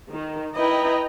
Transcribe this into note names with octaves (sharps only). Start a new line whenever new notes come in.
D#3
E4 B4 D#5 G5 A#5